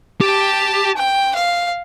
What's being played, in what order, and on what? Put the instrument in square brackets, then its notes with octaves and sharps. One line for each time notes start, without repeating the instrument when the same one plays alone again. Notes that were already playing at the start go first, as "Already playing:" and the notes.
[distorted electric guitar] G4 [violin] A5
[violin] G5
F5